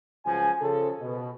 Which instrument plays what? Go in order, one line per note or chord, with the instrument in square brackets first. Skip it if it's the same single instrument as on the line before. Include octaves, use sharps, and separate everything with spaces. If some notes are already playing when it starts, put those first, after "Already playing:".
[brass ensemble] C#2 F3 F#3 G#5
C#3 F3 A4
B2